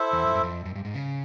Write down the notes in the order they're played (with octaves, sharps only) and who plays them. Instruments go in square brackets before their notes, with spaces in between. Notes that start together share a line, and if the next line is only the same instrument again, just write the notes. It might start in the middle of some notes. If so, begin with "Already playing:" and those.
Already playing: [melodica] E4 A4 C5 E5
[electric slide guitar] E2
F2
F#2
F2
F#2
G2
G#2
C#3